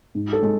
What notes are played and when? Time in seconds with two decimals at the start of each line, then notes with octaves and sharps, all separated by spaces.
0.15 G#2
0.33 A4
0.43 G#3